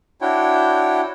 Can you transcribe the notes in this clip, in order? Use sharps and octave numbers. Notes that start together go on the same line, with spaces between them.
D4 E4 F#4 C#5 G5